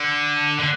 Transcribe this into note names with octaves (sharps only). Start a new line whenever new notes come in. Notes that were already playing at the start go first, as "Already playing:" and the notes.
Already playing: D3
D3